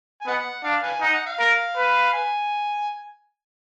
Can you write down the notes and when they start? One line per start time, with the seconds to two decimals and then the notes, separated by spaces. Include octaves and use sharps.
0.21 G#5
0.26 B3 B4 D#5 F#5
0.64 D4 F5
0.83 B4 F5 G#5
1.01 D#4 F#5
1.14 F#5
1.26 F5
1.39 A#4
1.77 B4
2.13 G#5